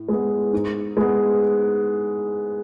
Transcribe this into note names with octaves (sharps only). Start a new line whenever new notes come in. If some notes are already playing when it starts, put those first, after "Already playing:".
Already playing: A2
G#3 B3
G#2
G#3 B3